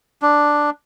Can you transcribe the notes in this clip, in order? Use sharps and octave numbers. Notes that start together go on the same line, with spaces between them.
D4